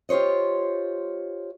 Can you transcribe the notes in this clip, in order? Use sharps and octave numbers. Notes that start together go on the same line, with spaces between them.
F4 G4 C5 C#5 D#5